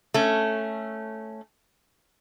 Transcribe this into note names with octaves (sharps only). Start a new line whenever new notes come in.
A3 C#4